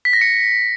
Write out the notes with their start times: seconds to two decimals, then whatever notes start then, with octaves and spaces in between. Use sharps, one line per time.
0.05 B6
0.13 A#6
0.21 C#7